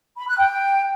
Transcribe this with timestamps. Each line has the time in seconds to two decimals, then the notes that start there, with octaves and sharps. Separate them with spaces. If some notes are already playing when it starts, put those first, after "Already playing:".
0.17 B5
0.27 F#6
0.38 G5